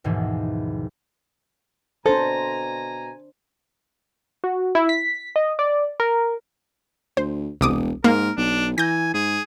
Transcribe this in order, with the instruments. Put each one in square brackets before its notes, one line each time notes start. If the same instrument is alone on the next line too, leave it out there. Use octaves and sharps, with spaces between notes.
[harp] G#1 D#2 G#2 B2 E3 F3
[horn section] B2 G#5 A#5 [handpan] D4 C5 [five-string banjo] A4
[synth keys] F#4
E4
B6
D#5
D5
A#4
[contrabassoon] D2 [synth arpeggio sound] C5
[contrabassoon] E1 [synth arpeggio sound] C2 D6 D#6
[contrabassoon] G#2 [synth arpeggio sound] A#3 [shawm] A#4
[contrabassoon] B1 [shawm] D4
[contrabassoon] E3 [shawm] G#5 [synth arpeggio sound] G6 A#6
[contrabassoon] G#2 [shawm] G#4